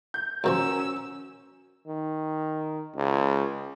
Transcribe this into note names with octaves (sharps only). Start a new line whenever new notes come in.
G6
D#2 B2 F3 C#4 F#4 A#4 E6
D#3
C#2